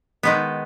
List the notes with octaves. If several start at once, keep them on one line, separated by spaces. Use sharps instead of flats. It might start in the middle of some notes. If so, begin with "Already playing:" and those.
D#3 G#3 B3